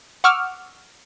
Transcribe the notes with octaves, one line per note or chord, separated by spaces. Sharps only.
F#5 C#6 D6 E6 F6